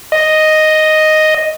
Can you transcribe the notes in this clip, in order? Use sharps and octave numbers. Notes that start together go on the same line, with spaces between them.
D#5